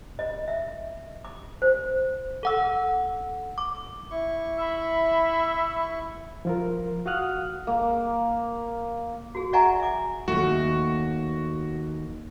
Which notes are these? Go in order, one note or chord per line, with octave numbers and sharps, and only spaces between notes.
D#5
E5
D6
C5
A4 F#5 E6
D6
E4 C#6
E5 B5
F3 F4 A#4
F#4 F5 F#5 D#6 F6 F#6
A#3
F#4 G#4
D5 E5 F#5 G#5 A#5 C#6
E5 D6
D#2 A3 F#4